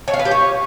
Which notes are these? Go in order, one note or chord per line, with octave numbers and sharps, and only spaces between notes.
C#5
F5
B4
G4
C#5